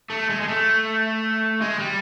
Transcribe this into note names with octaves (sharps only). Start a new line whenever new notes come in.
A3
G#3
G#3
A3
G#3
G3